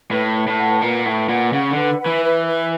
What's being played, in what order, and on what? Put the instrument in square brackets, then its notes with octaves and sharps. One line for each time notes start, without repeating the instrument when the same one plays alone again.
[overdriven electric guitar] A2 [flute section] B4
[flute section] B4
[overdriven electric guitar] A2
[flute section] F#5
[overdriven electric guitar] A#2 [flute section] B4
[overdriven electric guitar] A2 [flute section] B4
[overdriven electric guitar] A#2 [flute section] F#5
[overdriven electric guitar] C#3 [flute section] F#5
[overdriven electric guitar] D3
[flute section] B4
B4
[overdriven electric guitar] E3
[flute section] B4
B4